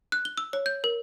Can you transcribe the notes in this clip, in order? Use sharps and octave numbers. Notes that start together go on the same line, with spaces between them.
F#6
G7
E6
C#5
G6
A#4